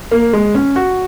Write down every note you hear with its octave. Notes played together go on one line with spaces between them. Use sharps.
A#3
G#3
C#4
F#4